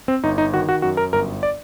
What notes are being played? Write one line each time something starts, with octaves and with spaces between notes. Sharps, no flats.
C4
G1 D#4
D#4
D#3 F#4
F#4
F#2 F#4
A#4
G1 A#4
D5